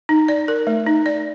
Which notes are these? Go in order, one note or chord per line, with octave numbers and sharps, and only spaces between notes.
D#4
D5
A#4
A3
D#4
D5